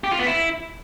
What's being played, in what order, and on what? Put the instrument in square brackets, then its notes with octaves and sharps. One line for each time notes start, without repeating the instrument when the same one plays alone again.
[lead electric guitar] G4
F4
B3
E4